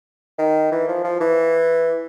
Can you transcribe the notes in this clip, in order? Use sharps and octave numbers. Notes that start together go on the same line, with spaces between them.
D#3
E3
F3
F3
E3